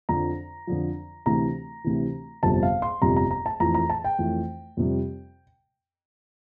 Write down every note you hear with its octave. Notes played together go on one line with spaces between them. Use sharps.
F2 D3 F3 A#5
F2 D3 F3
D2 C3 E3 A#5
D2 C3 E3
G1 F2 C3 G3 A5
F5
C6
G1 F2 C3 G3 A#5
A#5
A#5
A5
F2 E3 A3 A#5
A#5
A5
G5
F2 E3 A3
F2 C3 G3